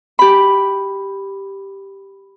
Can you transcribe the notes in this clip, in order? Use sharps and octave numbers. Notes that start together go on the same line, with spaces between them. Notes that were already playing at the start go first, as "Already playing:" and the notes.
G4 B5